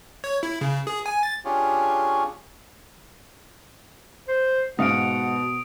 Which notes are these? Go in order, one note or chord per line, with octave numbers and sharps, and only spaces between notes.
C#5
E4
C#3
G#4
G#5
A6
C#4 D4 F4 G4 G#4 C#5
C5
G#2 B2 F5 F#5 D#6 D7